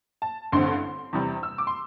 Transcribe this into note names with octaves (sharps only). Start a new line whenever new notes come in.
A5
A1 G2 D3 A3 C4 C6
E2 C3 G3
E6
D6
C6